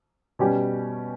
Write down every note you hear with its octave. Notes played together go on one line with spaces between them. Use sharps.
B2 G3 C#4 G4